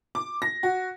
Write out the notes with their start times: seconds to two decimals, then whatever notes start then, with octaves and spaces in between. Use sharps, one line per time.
0.15 D6
0.42 A#6
0.63 F#4